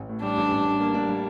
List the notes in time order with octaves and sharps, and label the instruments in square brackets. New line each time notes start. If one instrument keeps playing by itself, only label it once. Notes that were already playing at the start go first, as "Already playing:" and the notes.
Already playing: [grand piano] A1
A2
[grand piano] G3 [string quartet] D4
[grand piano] A1
A1
G3
A#3
D4
G3